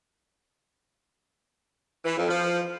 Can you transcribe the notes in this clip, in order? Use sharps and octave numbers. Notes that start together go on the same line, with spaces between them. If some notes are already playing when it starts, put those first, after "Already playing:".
E3
F2
F3